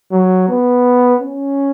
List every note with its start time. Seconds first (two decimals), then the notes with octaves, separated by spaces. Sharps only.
0.12 F#3
0.48 B3
1.21 C#4